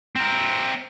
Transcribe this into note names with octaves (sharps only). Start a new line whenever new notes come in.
C4 A#4